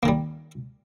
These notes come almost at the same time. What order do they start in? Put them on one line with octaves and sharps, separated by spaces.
A#3 D#3 G3